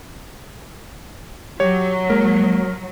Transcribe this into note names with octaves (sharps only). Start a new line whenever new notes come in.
F#3 G4 C#5
G#3 A#3 A#4